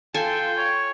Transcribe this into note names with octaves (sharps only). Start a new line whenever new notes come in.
F4 A4 G5 G#5
C#5